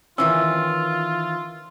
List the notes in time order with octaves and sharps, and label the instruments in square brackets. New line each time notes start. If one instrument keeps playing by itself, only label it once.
[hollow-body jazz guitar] D#3 E3 C#4 [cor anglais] F4 [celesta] E6